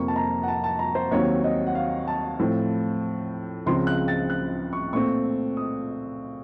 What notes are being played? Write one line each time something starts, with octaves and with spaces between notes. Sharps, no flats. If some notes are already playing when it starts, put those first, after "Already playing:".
Already playing: F2 C3 F3 A#3 C#6
A5
A#5
F#5
A5
A5
A#5
C5
D#2 D#3 F#3 C4 C#5
D#5
F#5
F5
A5
A2 F3 C4
C#2 C#3 F3 C4 C6
F#6
A6
F#6
C#6
A#2 A3 C4 C#6
D#6